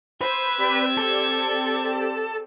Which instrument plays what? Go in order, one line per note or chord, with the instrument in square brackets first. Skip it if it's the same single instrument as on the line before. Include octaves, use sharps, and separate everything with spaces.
[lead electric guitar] B4 [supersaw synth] C5 [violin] E6 G#6
[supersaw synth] C4 G4 D5
[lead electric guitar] A4